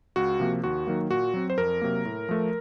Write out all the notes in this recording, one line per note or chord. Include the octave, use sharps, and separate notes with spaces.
C#2 F#4
C3 F3 A#3
D#2 F#4
D#3 F#3 A#3
A#2 F#4
F#3 C4
C5
F2 A#4
C3 F#3 A#3
A2
F3 A3